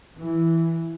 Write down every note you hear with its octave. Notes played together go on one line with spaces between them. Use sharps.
E3